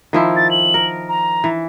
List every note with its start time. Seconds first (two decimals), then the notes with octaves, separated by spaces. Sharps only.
0.13 D#3 F3 E4
0.36 A6
0.51 F#7
0.74 A#4
1.09 A#5
1.44 E3